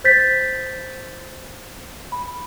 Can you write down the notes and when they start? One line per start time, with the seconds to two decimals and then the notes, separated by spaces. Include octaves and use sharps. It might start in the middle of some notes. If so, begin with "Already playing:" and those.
0.04 C5 G6 A6 B6
2.12 B5